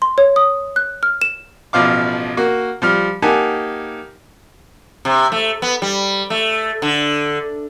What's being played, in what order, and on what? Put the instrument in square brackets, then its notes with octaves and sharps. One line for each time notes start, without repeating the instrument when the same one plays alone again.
[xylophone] C6
C#5
D#6
F#6
F6
E7
[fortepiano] A1 B2 F3 F5 D6
A#3 F#4
F3 G3 F6
A#3 D#4 G4 F#5 G#5 A5
[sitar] C3
A3
B3
G3
A3
D3